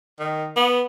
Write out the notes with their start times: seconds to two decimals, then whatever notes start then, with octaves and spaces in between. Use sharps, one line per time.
0.19 D#3
0.56 B3